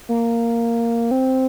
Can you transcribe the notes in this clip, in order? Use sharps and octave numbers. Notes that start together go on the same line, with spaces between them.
A#3
C4